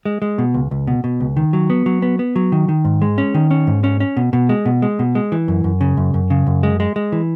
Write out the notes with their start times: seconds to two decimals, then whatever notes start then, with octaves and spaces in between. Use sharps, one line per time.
0.05 G#3
0.22 G#3
0.38 B2
0.54 C#2
0.71 C#2
0.87 B2
1.04 B2
1.20 C#2
1.37 D#3
1.53 F#3
1.70 B3
1.86 F#3
2.02 B3
2.19 B3
2.36 F#3
2.52 D#3
2.69 D#3
2.85 G#2
3.02 G#3
3.18 C#4
3.34 D#3
3.51 C#4
3.67 G#2
3.84 C#4
4.00 C#4
4.17 B2
4.33 B2
4.49 G#3
4.65 B2
4.82 G#3
4.99 B2
5.15 G#3
5.32 E3
5.48 F#2
5.64 F#2
5.81 C#3
5.97 F#2
6.14 F#2
6.30 C#3
6.47 F#2
6.63 G#3
6.80 G#3
6.96 G#3
7.12 E3